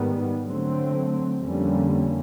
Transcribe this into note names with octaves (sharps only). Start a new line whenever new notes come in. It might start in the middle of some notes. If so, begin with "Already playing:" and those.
Already playing: G#2 D#3 G3 B3
D3 F#3 A3 C4
F2 D3 G3 A#3 C#4